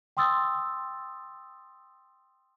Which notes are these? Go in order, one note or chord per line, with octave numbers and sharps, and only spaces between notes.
G5 C6 D#6 E6 A6